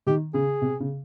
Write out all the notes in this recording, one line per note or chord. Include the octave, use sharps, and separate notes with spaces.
D#3 G4
C#3 G#4
C3
C#3